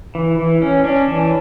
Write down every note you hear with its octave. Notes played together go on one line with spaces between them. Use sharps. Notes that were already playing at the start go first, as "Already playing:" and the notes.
E3
E3
C#4
C#4 D4
E3